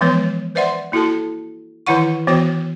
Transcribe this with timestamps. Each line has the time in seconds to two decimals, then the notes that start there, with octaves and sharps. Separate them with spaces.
0.01 E3 F3 G#3 B3 B4 C#5
0.55 B4 C5 D5 E5 F#5 C6
0.92 A#3 E4 F#4 A4 A5
1.86 D#3 E3 E4 C#5 F#5 C#6
2.27 E3 B3 F#4 C5 C#5 G5